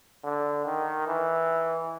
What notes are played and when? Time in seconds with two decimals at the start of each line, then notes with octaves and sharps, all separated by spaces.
0.23 D3
0.65 D#3
1.07 E3